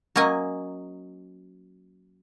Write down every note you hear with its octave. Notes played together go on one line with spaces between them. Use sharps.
F#3 A#3 C#4 D#5 G#5